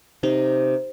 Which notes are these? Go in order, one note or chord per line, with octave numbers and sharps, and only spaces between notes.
C3 D#4